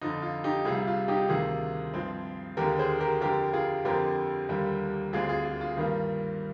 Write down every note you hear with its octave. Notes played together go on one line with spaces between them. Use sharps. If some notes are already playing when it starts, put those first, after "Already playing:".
F2 D3 F3 D#4
F4
D#4 G4
C2 C3 G3 F4 G#4
F4
D#4 G4
D2 C3 D#3 F4 G#4
G2 F3 G#3 C4
D#2 D3 G#3 G4 A#4
G#4 C5
G4 A#4
F2 D3 G#3 G4 A#4
F4 G#4
F2 D3 G#3 C4 G4 A#4
D#2 D3 G3 A#3
D2 D3 G#3 C4 F4 G#4
F4 G#4
F4
F4
G2 D#3 G3 A#3